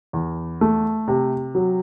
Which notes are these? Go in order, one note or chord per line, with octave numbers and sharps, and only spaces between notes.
E2
A3
C3
F#3